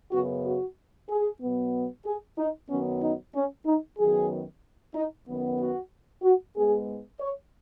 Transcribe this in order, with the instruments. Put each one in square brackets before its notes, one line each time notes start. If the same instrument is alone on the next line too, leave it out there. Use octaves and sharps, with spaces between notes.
[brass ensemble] F#2 C#3 B3 F#4
F#4
G#4
B2 F#3 B3
G#4
D#4
F#2 D#3 F#3 B3 C#4
D#4
C#4
D#4
F#2 D#3 F#3 B3 G#4
D#4
F#2 D#3 B3
F#4
F#4
G#2 G#3 B3 G#4
C#5